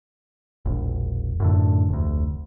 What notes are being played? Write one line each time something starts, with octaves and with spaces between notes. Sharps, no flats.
E1 A#1
F#2 A2 D3
F1 D2